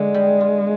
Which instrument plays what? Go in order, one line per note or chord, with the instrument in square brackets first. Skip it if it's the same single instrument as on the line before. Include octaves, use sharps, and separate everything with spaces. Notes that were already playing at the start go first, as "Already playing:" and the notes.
Already playing: [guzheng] D3 [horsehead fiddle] G#3
[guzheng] G3
F4